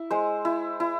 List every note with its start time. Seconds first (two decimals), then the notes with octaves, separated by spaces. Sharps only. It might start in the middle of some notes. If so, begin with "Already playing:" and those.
Already playing: E4
0.11 G#3 C5
0.45 E4
0.80 E4